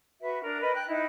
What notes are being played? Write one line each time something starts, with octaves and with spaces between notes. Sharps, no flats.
F#4 B4 E5
D4 A#4
B4 D#5
G5 F#6
D#4 E4